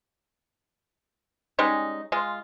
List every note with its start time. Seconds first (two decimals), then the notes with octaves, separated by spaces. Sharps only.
1.59 G3 G#3 C#4 D#4
2.12 G#3 F4